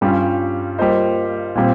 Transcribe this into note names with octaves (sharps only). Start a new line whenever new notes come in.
G2 G3 C#4 F4
G3 A#3 F4 C5 D#5
A#2 G3 C4